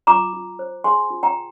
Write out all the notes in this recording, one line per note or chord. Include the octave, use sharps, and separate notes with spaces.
F4 A#5 D6
F4
C5
G#4 G#5 C6
F4
G5 A#5